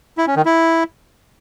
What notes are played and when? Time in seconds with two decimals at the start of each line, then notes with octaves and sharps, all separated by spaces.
0.18 E4
0.27 C#4
0.36 D#3
0.45 E4